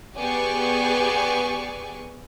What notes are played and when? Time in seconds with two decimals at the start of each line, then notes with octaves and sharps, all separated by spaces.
0.17 B3 G4 G#4 D5 G#5 C#6